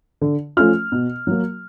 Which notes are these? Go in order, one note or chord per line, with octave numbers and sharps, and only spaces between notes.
D3
F3 A3 C#4 F4 F6
B2
F#3 A#3